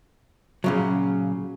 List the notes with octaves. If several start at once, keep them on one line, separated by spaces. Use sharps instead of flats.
A#2 C#3 F#3